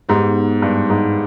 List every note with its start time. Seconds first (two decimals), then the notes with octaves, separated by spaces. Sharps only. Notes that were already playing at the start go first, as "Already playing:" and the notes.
0.09 G#2 B3 D#4 G4
0.62 G2
0.90 G#2